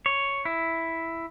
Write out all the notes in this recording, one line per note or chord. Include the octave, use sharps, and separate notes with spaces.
C#5
E4